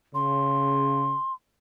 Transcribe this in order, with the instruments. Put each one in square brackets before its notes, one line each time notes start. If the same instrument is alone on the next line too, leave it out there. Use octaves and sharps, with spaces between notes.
[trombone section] C#3 [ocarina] C6